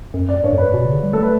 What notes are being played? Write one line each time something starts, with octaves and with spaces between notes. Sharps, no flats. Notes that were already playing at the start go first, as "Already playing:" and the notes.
F#2
D5
G2 C#5
F#2
G2 B4
B2
C#3
D3
G3
A3 A4
B4